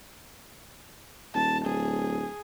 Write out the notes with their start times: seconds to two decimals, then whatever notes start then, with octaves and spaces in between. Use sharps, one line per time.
1.34 D#1 A5
1.65 D1 G#4